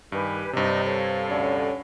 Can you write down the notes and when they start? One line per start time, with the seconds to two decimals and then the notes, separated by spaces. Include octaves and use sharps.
0.12 G2 D#3 G4 B4 G#5
0.53 G2 C3 D#4 C5 D5 D#5
0.83 A4 C#5 F5
1.30 D2 A2 D3 C#4